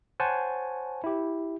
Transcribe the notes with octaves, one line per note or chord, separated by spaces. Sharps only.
C5 C#5 F#5 G#5 A5
E4 G4